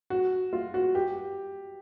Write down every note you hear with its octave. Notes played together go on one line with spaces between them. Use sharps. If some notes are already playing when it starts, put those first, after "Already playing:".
F#4
F4
F#4
G4